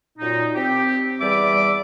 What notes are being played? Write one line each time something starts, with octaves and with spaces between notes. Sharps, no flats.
F#2 A#2 D#4
C4 G4
E2 G3 D5 E5 D6